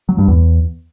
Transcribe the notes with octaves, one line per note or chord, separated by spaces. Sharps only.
F#3
G2
E2